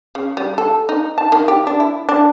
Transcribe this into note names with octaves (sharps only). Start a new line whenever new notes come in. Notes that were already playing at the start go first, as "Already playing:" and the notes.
C#3
G3
A4
D#4
A5
D#3
G4
D4
E4
D4